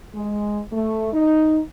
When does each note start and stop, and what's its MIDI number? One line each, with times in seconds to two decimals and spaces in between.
0.14 0.59 56
0.72 1.08 57
1.13 1.60 63